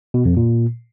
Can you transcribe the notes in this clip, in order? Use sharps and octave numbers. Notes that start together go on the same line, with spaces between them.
B2
F2
A#2